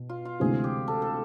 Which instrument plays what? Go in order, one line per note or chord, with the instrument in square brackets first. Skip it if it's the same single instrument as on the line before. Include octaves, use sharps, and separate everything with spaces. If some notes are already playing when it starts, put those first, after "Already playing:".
Already playing: [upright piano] B2
[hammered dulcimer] F4
F4
[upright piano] D2 C3 E3 G#3 C4 [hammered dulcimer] G#4
[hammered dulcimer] G4
A4
A4